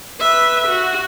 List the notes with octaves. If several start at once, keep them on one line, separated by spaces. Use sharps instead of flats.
B4 E5
F#4